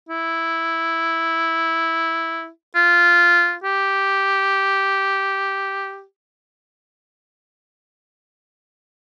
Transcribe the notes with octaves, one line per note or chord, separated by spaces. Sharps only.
E4
F4
G4